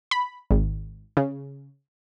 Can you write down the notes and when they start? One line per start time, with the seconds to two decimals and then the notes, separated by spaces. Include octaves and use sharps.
0.11 B5
0.51 G#1
1.17 C#3